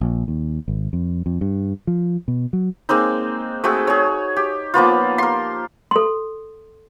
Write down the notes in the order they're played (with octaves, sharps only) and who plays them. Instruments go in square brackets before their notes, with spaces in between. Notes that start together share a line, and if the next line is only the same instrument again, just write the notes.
[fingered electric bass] A#1
D#2
G#1
F2
F2
G2
F3
B2
F#3
[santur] G#3 A#3 C4 D#4
A3 C4 F#4 G#4
G#4 C#5
G4
F3 A#3 B3 F4
A#4 C6
[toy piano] A4 C6